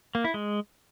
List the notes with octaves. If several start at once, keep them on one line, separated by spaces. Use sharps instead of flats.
A#3
E4
G#3